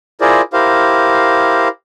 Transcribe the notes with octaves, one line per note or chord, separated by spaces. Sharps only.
E4 F4 G#4 A#4 C5 D5
E4 G4 A#4 C5 F5